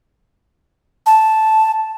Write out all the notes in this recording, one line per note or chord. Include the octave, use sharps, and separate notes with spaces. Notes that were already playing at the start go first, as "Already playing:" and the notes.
A5